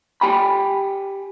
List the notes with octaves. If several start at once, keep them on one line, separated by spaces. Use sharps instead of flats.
G4 G5 G#5 B5